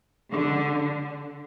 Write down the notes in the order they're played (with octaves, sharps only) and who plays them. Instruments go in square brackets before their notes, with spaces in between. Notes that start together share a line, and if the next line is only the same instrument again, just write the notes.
[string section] D3